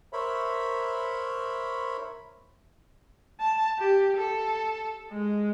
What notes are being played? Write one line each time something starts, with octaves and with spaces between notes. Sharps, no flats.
A#4 C5 C#5 E5 B5
A5
G4
A4
G#3